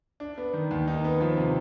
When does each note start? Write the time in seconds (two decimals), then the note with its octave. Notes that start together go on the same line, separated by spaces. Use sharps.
0.20 D4
0.38 B3
0.53 D#3
0.71 D#2
0.88 D#4
1.04 B3
1.21 F3
1.37 C3